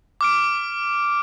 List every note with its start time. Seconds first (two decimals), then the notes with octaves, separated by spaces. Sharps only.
0.21 D6 F6 D7